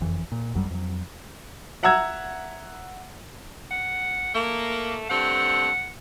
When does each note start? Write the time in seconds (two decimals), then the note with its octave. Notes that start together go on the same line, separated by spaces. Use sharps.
0.01 F#1 F2 E3
0.32 A#2
0.54 G#1 F#2 F#3 G3
0.71 F2 F#3
1.83 E5 F#5 A#5 E6 G#6
3.71 F#5
4.35 A3 A#3
5.09 G2 A3 C4 F#5